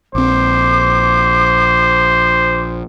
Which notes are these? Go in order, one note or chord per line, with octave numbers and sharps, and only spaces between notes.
A#1 C4 C5 D6